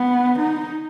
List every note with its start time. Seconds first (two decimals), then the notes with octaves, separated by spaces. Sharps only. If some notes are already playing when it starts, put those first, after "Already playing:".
Already playing: B3
0.39 D#4